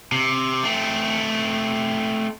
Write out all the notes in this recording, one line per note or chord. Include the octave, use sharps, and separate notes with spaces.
C3
A3 C4